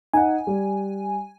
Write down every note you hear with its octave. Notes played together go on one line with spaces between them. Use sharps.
D#4 F#5 G#5
G3